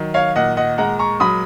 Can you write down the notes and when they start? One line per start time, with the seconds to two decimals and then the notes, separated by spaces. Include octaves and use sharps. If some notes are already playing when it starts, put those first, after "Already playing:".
Already playing: D#3 F#3
0.14 C#5 F5
0.36 A#2 D#5 F#5
0.57 D#5 F#5
0.78 G#3 F#5 A#5
0.99 A#5 C#6
1.20 F#3 B5 D#6